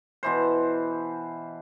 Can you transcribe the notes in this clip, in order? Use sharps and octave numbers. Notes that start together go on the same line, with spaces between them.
B2 E3 C5